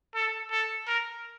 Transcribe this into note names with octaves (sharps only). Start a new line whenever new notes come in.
A4
A4
A#4